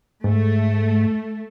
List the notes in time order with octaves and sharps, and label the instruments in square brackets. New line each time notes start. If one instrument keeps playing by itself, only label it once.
[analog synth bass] G#2 [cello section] A3